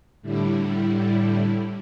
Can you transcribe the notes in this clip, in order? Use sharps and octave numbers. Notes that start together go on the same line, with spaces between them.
A2 D3 G3 E4